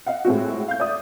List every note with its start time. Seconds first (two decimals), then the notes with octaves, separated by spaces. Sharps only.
0.06 D#5 F5 F#5
0.25 A2 G#3 C4 F#4
0.68 F5 G6
0.80 D5 E5 D#6